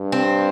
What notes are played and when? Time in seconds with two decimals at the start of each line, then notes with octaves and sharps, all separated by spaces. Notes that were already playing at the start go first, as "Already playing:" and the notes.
Already playing: G2
0.12 C4